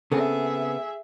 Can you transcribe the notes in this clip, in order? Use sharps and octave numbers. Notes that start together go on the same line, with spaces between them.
C#3 B3 C4 G#4 A4 E5